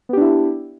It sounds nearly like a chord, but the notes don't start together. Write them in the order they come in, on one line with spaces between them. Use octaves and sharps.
B3 G4 D4 E4